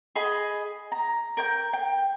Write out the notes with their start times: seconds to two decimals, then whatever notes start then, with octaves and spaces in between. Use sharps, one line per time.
0.15 G#4 D#5 B5
0.92 A#5
1.37 A#4 G5 G6
1.73 G5